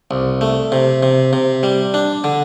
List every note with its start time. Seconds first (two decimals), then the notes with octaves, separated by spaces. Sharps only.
0.11 C2
0.41 A3
0.72 C3
1.03 C3
1.33 C3
1.63 G3
1.94 D4
2.24 D3